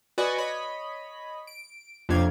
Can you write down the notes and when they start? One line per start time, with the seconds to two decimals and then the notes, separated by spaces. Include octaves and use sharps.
0.18 F#4 B4 D5 D#5 F#5 G#5
0.38 C#5 D#5 B5
1.47 D7
2.09 F2 C3 A#3 D4 F5 G#6